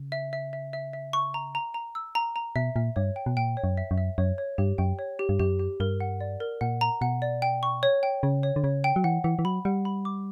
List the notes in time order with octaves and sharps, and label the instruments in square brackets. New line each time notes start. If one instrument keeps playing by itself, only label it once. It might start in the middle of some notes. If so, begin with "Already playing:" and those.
Already playing: [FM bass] C#3
[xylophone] E5
E5
E5
E5
E5
C#6
A#5
A#5
A#5
E6
A#5
A#5
[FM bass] B2 [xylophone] E5
[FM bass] A#2 [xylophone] E5
[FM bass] G2 [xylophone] C#5
[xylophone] G5
[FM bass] B2
[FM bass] A#2 [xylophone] G5
[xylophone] C#5
[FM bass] F#2
[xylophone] E5
[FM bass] F#2
[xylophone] E5
[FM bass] F#2 [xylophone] C#5
[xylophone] C#5
[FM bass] G2 [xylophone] G4
[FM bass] F#2 [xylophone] G5
[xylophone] C#5
G4
[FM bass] G2
[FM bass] F#2 [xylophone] G4
[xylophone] G4
[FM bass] G2 [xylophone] A#4
[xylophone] F#5
D5
A#4
[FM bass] A#2 [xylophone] F#5
[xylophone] A#5
[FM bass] B2 [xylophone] F#5
[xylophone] D5
G5
C#6
C#5
G5
[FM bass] C#3 [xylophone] C#5
[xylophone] C#5
[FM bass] D3
[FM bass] C#3 [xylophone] C#5
[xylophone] G5
[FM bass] F#3
[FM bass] E3 [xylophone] F#5
[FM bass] E3 [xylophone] F#5
[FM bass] E3
[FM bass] F#3 [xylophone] B5
[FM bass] G3 [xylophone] F#5
[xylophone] B5
D6